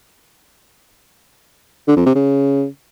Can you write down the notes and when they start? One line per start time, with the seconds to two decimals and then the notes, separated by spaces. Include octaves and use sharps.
1.87 D3
1.97 F2
2.06 C3
2.15 C#3